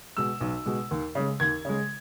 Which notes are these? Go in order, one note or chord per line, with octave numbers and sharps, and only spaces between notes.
B2 G#3 E6
B1
B2 G#3
D#2
C#3 G#3
D#2 G#6
C#3 G#3